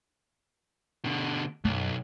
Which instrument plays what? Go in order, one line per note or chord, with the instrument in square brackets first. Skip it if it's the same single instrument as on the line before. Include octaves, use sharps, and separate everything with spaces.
[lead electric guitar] B2 D3
[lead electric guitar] B1 [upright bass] F#2